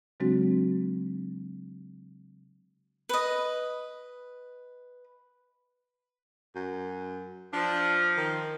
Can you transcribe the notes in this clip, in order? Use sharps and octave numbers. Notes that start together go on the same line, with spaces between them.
C#3 F#3 G#3 C4 D4 F#4
B4 D#5
F#2
F3 D4
D#3